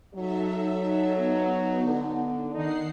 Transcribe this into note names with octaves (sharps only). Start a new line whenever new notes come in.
F#3 D#4 A4 E5
B3 D#4
D3
D3 D#3 D#4 F#5 C7